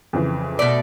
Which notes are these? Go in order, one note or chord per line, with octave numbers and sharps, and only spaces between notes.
F2 C#3 E3
B2 A3 D5